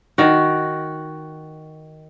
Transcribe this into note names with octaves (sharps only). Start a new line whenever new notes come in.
D#3 F#4